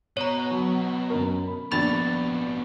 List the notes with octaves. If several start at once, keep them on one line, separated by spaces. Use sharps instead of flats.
B2 C#5 A#5
F#3
F#2 A#4
B5
A#1 A#2 B3 B5 A6 F7